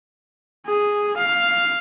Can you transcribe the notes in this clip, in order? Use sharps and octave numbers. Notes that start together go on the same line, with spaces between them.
G#4
F5